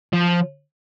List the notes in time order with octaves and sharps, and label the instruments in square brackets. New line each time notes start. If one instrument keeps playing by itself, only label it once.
[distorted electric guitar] F3